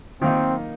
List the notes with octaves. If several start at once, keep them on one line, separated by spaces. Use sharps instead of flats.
D#3 A#3 C4 D#4